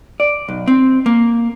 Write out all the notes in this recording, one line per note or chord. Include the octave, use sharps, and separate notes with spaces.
D5
B1
C4
A#3